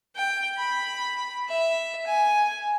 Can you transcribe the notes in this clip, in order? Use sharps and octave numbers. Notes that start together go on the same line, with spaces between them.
G5
B5
E5
G#5